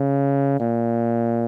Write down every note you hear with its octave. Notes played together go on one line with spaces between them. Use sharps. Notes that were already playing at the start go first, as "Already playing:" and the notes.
Already playing: C#3
A#2